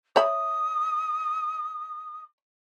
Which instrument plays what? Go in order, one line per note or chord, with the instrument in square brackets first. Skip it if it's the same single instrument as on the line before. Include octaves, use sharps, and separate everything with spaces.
[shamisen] C#5 E5 B5 [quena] D#6